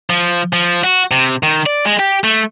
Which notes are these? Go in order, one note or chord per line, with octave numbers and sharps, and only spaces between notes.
F3
F3
F#4
C3
D#3
D5
G#3
G4
A3